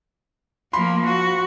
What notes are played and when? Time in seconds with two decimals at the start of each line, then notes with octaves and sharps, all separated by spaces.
0.73 F3 A#3 B5 C6
1.06 F#4